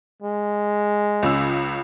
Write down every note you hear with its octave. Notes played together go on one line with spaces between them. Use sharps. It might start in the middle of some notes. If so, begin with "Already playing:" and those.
G#3
C#2 C#3 E6